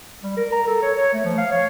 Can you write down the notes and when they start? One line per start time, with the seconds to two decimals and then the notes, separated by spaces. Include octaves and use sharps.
0.23 G3
0.37 A#4
0.52 A#5
0.67 A4
0.82 C#5
0.96 C#5
1.13 A3
1.25 F3
1.38 F5
1.51 C#5